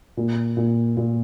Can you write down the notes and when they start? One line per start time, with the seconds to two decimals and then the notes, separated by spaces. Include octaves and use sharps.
0.17 A#2
0.57 A#2
0.97 A#2